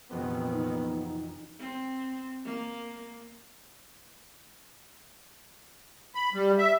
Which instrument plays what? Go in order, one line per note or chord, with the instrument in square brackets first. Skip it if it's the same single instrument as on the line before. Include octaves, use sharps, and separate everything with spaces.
[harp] E1 F2 [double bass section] A#1 C3 D#3 [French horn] B3 [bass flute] C4
[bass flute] D#4
[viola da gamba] C4
A#3
[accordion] B5
G3
E5